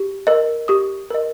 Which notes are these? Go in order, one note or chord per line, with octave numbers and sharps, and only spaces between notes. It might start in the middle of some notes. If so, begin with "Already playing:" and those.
Already playing: G4
A#4 D#5
G4 D#6
A#4 D#5